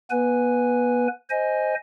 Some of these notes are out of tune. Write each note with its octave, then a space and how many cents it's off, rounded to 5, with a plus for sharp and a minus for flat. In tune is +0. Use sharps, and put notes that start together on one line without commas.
B3 -35 B4 +0 G#5 +0
C5 +0 D#5 +0 G#5 +0